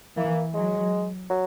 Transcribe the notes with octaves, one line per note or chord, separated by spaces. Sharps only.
E3 A#3
F#3 G#3
F#3